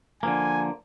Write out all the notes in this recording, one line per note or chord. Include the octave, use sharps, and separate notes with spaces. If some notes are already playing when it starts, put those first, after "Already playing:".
D3 F3 A#3 G#5